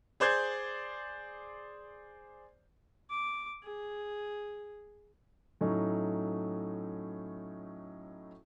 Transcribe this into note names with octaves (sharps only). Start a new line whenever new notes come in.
G#4 C5 D5 G6 G#6
D6
G#4
A2 F#3 A3 C#4 D#4